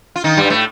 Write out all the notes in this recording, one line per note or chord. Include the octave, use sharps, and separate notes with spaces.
F4
D#3 D#4
G2 G3
A2 A3